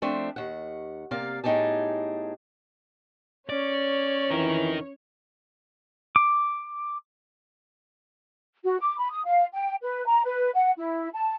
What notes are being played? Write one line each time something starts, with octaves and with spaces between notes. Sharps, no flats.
F3 A3 C4 D4
D#2 F#5
C3 A#3 D5 F5
A2 B3 D#4 G4 G#4 A5
C#4 C#5 D5
F2 E3 D#4 A#4
D6
F#4
D6
B5
D#6
F5
G5
B4
A#5
B4
F#5
E4
A5